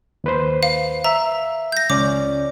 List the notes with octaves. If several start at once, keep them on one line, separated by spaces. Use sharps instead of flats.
D#2 B4 C5
F5
E5 A#5 E6
G6 A#6
C#2 C#4 D5 D6